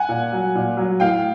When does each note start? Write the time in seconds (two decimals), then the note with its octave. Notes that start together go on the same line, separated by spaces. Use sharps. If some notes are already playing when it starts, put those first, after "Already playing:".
Already playing: F#5 G#5
0.09 A#2
0.32 F#3
0.55 A#2
0.77 F#3
1.00 A2 F5 G5